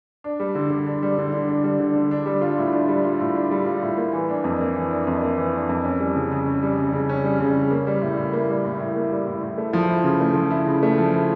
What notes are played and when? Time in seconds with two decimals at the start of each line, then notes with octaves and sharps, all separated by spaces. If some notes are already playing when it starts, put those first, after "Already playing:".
0.24 D4
0.40 G3
0.55 D3
0.70 D3
0.87 D4
1.02 G3
1.18 D3
1.33 D3
1.48 D4
1.64 G3
1.79 D3
1.95 D3
2.11 D4
2.26 G3
2.41 F4
2.58 A2
2.73 D4
2.88 G3
3.04 F4
3.20 A2
3.35 D4
3.51 G3
3.66 F4
3.83 A2
3.97 A#3
4.13 E3
4.29 D4
4.44 F2
4.60 A#3
4.76 E3
4.91 D4
5.07 F2
5.22 A#3
5.37 E3
5.54 D4
5.69 F2
5.85 C#4
6.00 G3
6.15 C#3
6.31 C#3
6.46 C#4
6.63 G3
6.77 C#3
6.93 C#3
7.09 C#4
7.24 G3
7.40 C#3
7.56 C#3
7.71 A#3
7.87 G3
8.01 A2
8.17 A2
8.33 A#3
8.49 G3
8.65 A2
8.80 A2
8.96 A#3
9.11 G3
9.27 A2
9.43 A2
9.58 A3
9.73 F3
9.89 E4
10.04 C#3
10.20 A3
10.35 F3
10.50 E4
10.66 C#3
10.83 A3
10.98 F3
11.14 E4